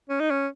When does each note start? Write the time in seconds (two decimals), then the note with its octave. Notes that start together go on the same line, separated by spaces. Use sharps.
0.09 C#4
0.20 D#4
0.30 C#4